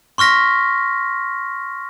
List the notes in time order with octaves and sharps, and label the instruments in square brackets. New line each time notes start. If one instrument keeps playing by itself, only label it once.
[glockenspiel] C6 C#6 F6 A#6 B6